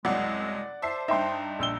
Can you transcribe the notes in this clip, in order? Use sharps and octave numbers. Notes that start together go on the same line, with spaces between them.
F#1 C2 F#3 G#3 D5 F#5
C5 E5 A5 C7
G2 D#4 E5 G5 C6
A#1 E6 G7